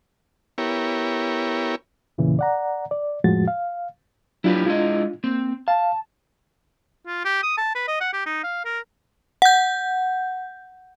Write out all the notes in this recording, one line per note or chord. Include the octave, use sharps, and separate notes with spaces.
B3 E4 G4 A#4 C#5
E2 A#2 C#3 E3
D5 F#5 A#5
D5
F2 A2 F3 G#3 F#4 A6
F5
F#3 D4 E4 F4 G4 B4
G#3 D4 E4 F4 D#5
A#3 C4
F5 A5
F4
G4
D#6
A5
B4
D#5
F#5
G4
D#4
F5
A#4
F#5 G6